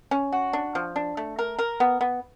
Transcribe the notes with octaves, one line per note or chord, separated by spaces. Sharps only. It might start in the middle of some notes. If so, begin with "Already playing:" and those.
C#4
F#4
D4
F3
D4
A3
A#4
A#4
B3
B3